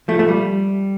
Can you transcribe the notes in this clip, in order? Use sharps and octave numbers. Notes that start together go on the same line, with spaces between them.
F3 A3
A3
G3